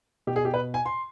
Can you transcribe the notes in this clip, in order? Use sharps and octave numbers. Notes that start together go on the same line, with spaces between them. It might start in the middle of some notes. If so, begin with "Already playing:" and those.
B2 G4
G#4
G4
B4
G#5
C6